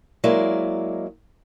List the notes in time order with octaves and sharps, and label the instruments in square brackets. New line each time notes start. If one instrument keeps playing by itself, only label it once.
[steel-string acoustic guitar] F#3 G#3 A#3 E4 D5